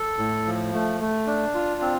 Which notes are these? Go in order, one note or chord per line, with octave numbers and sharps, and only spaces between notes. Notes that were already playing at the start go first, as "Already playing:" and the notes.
Already playing: A4
A2
F3
A3
A3
D4
F4
C4